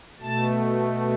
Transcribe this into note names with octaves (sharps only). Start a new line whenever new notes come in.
B2 A3 A5